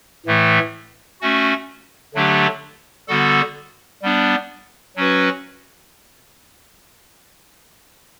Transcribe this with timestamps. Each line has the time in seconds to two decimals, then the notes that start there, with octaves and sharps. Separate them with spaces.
0.26 A2 E3 A3
1.21 A3 C#4 F#4
2.15 D3 F#3 A3 D4 G4
3.08 D3 G3 B3 F#4 A4
4.02 G3 B3 D4
4.96 F#3 C#4 F#4 B4